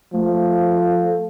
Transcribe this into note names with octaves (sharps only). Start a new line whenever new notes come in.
F3 A3